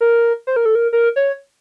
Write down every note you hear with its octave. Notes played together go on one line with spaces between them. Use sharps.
A#4
C5
A#4
A4
A#4
A#4
C#5